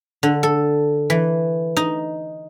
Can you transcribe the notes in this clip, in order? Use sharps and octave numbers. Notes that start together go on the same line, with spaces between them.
D3
A4
E3
D#4